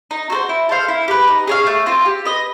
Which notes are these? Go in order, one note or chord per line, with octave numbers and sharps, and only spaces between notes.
D#4
F#4 A4 C5
E4
A4 C5 F5
E4
G4 B4
D#4
G#4 C#5 F5
A3
C4 F4
G4
B4 D#5